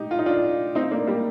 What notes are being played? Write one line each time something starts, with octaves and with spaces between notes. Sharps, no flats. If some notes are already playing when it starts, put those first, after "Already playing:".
Already playing: D#4 G4
F4
D#4
D4 F4
C4 D#4
A#3 D4
G3 A#3